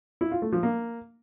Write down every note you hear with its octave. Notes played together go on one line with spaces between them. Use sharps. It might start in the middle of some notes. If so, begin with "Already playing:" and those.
E4
F4
A3
F3
A#3